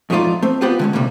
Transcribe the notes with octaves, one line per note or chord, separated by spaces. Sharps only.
F2 G#2 A3 D#4 F4 D5
A3 C4
B3 C4 F4 G4 B4
D3 G#3 C#4
A2 C3 G3 A3 A#3